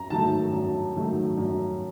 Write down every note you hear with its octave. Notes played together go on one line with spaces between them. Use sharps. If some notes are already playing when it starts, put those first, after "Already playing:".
Already playing: F#2 A#5
D#3 F#3 A3 A5
F#2
D#3 F#3 A3
F#2